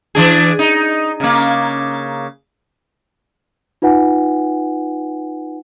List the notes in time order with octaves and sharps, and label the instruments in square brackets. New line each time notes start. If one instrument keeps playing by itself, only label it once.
[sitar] E3 D4 G#4
D#4
C#3 A#3
[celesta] D#4 F4 B4 F#5 G#5